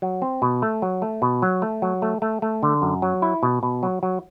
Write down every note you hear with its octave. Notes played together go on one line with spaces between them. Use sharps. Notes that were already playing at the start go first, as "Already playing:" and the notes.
F#3
C4
B2
A3
F#3
A3
B2
F#3
A3
F#3
A3
A3
A3
D3
F#2
F#3
E4
B2
B2
F#3
F#3